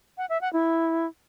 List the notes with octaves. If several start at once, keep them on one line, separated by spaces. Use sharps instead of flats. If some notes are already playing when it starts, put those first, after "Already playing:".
F#5
E5
F#5
E4